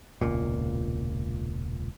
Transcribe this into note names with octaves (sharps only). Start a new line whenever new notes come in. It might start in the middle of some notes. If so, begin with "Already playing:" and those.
E1 C#2 A#2